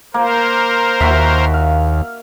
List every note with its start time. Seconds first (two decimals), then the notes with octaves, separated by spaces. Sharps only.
0.14 A#3 A#4 C5
1.01 D#2 F#4 E5
1.54 F5